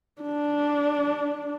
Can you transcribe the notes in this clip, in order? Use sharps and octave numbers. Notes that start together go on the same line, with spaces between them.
D4